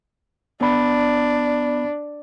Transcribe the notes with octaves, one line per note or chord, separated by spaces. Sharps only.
B3 D4 B5